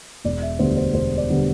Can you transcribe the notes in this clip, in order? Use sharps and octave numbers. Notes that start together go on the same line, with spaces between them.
E1 D5
E5
D2 D3 G3 B3 C5
C5
E1 C5
D5
D3 G3 B3